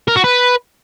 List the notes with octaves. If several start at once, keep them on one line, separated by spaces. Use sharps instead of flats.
A#4
F#4
B4